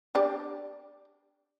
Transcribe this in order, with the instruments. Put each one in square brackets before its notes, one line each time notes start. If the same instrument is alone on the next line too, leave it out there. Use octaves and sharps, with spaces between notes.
[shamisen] D4 G4 D5